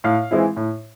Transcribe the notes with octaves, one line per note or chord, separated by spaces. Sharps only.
A2 F5
E3 G#3 C4 E4
A2